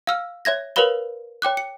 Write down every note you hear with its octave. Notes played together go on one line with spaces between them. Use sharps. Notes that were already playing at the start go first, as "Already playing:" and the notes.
F5 E6 F6
C#5 E5 G#6 A#6
A#4 B4 C#5 F5 B5 G7
C#5 G5 D6 F#6
C#7